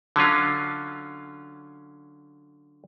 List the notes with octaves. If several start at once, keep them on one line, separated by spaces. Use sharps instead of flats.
D3 F#3 C#4 F4